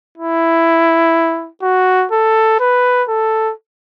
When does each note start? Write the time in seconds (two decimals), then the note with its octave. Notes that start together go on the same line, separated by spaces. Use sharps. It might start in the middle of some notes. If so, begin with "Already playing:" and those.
0.18 E4
1.62 F#4
2.12 A4
2.60 B4
3.09 A4